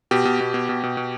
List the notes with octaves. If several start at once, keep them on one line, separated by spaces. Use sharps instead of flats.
B2 G4
B2
B2
B2
B2
B2
B2